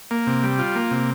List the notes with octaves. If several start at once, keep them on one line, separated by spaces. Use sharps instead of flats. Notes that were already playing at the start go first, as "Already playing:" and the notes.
A#3
C3
G3
F4
A#3
C3